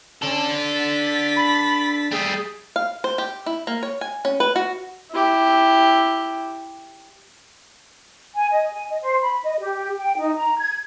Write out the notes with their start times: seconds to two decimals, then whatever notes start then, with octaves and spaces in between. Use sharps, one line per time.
0.22 C#4 D4 A4
0.52 A6 B6
1.36 B5
2.11 G3 A3 G#4
2.76 F5
3.04 C5
3.18 G4
3.46 E4
3.67 A#3
3.83 C#5
4.01 G#5
4.25 C#4
4.40 B4
4.56 F#4
5.11 E4 G4
8.35 G#5
8.53 D#5
8.72 G#5
8.90 D#5
9.01 C5
9.22 B5
9.44 D#5
9.61 G4
9.98 G5
10.18 D#4
10.37 A#5
10.59 G#6